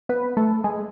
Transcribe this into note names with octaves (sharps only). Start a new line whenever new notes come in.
B3 B4
A3 A4
G#3 G#4